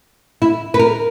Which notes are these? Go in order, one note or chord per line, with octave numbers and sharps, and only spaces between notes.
E4
B4
A#4